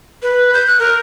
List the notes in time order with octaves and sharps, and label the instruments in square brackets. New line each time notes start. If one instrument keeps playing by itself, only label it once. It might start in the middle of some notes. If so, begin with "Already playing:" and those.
[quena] B4
G6
F#6
A#4